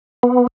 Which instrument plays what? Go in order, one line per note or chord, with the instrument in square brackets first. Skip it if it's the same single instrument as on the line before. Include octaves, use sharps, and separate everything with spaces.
[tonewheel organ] B3